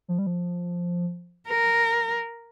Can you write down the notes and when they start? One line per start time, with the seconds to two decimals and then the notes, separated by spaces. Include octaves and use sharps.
0.08 F3
0.18 G3
0.27 F3
1.49 A#4